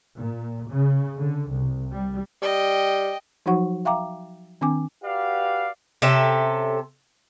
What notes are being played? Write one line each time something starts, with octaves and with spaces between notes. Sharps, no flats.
A#2
C#3
D3
C2
G3
G3 D#5 G5
F3 F#3 D#4 F#4 F#5 C#6
E5 F5 G5 A#5 D6
D#3 C4 D4 G#5 D6
F#4 G4 B4 D5 F5
C3 C#4 A4 E5